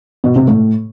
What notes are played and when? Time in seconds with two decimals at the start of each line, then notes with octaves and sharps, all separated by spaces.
0.24 B2
0.36 C3
0.48 A2